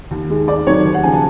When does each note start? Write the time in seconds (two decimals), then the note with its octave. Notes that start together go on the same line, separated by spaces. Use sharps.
0.11 D#2
0.30 D#3 G#3
0.48 G#2 D5
0.67 D#3 F#3 A3 C#5
0.85 D#2
0.94 F#5
1.03 C#3 F3 G#5
1.12 A5